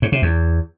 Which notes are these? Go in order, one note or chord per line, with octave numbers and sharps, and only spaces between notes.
G#2
C3
E2